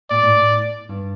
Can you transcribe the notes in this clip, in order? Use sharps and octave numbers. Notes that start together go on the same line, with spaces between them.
A#2 D5
A2
A2
G2